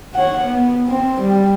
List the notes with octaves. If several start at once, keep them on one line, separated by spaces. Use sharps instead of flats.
C#5 F#5
B3
C4
G3